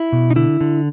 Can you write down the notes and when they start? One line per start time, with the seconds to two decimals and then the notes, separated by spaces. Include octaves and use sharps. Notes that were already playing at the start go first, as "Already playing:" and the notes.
Already playing: E4
0.12 B2
0.30 D#4
0.36 D3 E4
0.61 D3